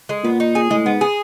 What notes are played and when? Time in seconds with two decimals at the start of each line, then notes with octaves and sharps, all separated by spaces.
0.09 G#3
0.24 A#2 B3
0.40 D#4
0.55 G#4
0.70 A2 G#3
0.85 G#2 B3
1.01 G#4